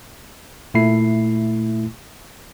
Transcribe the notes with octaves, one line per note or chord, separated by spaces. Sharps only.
A#2 A3 E4 C7